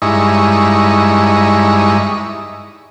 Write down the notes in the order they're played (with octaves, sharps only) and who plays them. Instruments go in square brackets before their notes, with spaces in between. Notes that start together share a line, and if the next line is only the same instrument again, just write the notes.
[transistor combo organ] G2 G#3 D#4 E4 C#6